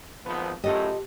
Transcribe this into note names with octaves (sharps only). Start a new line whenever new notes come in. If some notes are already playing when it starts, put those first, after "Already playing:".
G#1 F3 B3
F#2 A2 F4 G4 A4 D#5